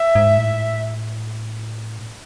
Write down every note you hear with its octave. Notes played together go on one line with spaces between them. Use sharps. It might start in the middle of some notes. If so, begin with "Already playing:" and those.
Already playing: E5
G#2
A2